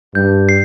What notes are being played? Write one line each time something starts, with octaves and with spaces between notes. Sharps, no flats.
G2 G6
C7